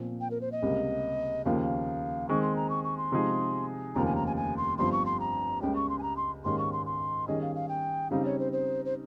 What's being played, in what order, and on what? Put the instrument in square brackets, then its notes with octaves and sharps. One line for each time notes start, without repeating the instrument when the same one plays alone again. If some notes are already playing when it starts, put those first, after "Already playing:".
Already playing: [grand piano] A#2 F3 C4
[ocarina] G5
A#4
C5
D#5
[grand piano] C#2 C3 G3 A#3
[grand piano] D#2 C#3 F3 A#3 [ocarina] F5
[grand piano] D#3 G#3 C4 [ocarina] C#6
[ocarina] C6
A#5
C#6
C#6
C6
[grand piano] C3 F3 G#3 D#4 G#4
[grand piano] F1 D#2 C#3 F3 A#3 [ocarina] A#5
[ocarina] G#5
A#5
G#5
G#5
C6
[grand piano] G1 G2 F3 C4 [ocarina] C6
[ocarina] C#6
C6
A#5
[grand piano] C#2 C#3 G3 A#3 C#4 [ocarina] G5
[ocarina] C#6
C6
G#5
A#5
C6
[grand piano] G#2 D#3 A#3 C#4 G4 [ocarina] C6
[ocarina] C#6
C6
C6
[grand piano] D#3 G3 C#4 G#4 [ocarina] D#5
[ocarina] F5
F5
G5
[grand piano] C#3 G3 C4 D#4 [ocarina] F5
[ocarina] C#5
C5
C5
C5